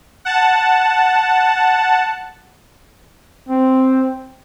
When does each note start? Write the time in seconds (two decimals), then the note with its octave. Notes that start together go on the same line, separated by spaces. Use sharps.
0.25 F#5 A5
3.49 C4